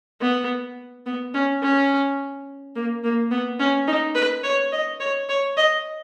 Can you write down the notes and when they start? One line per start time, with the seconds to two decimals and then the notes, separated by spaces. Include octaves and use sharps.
0.21 B3
1.06 B3
1.34 C#4
1.63 C#4
2.76 A#3
3.04 A#3
3.31 B3
3.59 C#4
3.87 D#4
4.15 B4
4.43 C#5
4.72 D#5
5.00 C#5
5.29 C#5
5.57 D#5